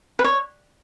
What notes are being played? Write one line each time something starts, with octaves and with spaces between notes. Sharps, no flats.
B4
C#5